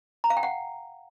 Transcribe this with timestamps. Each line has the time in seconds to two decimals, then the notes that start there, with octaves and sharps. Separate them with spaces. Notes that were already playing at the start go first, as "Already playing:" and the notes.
0.24 A#5
0.30 F5
0.37 G5
0.43 F#5